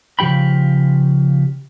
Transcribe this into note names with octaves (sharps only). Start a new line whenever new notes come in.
C#3 F3 G4 G5 B5